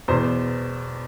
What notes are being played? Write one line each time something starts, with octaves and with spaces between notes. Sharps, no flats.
E2 B2 C5